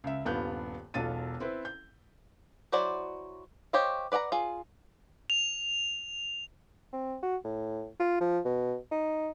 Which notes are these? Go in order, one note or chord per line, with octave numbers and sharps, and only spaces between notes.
C#2 E5
D#1 G2 B3 F4 F#6 G6
E1 B1 F4 A4 A6 D#7
C4 E4 B4
G6
F#3 E4 F#4 C5 D5
G4 C5 C#5 D#5 F5
B4 D5 F#5 G#5 A#5
F4 G#4
F7
C4
F#4
A2
F4
F3
B2
D#4